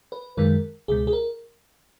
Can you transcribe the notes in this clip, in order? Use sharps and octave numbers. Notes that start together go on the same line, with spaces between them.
B4
F#2 D#3 G#3 A#4
C#2 B2 G#3 G#4
G#4
A#4